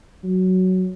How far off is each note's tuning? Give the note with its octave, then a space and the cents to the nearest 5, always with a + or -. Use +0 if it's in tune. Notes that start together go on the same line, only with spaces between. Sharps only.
F#3 +5